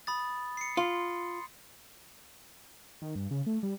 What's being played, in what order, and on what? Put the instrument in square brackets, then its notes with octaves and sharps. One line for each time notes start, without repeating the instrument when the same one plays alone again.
[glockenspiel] B5 D#6 A6
C7 C#7
[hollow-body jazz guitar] F4 [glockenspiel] C6
[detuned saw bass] D#3
G2
C#3
A3
G3